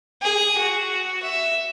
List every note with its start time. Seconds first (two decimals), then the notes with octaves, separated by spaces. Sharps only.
0.22 G#4
0.57 F#4
1.23 E5